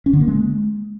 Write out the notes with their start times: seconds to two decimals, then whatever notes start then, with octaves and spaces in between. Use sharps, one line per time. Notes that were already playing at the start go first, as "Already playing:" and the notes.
0.06 C#4
0.13 D3
0.21 A#3
0.28 G#3